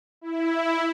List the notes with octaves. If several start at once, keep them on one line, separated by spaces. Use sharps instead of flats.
E4